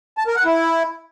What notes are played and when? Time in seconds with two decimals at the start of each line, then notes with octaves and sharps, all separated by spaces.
0.18 A5
0.27 A#4
0.36 F#5
0.45 E4